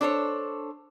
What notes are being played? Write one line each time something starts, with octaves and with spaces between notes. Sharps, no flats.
D4 A4 C5 C#5